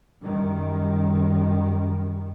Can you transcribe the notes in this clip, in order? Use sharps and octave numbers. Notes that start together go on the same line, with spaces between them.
F#2 D#3 G3